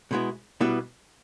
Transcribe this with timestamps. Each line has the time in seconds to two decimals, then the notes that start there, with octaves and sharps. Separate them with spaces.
0.11 B2 G#3 B3 E4
0.60 B2 G3 B3 E4